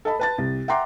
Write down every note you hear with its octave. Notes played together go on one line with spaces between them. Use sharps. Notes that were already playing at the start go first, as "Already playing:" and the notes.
A4 D#5 A5 B5
B4 A5 A6
C2
E5 F#5 G5 A#5 C6 D6